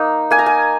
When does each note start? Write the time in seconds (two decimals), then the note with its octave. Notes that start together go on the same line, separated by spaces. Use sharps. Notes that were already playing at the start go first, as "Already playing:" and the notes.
Already playing: A#3 D#4
0.31 A#3 G#5
0.39 A#5
0.46 G#5